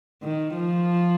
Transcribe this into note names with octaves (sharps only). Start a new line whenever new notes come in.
D#3
F3